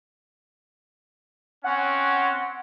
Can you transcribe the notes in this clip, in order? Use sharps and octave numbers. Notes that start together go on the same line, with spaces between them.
C4 C#4 F#5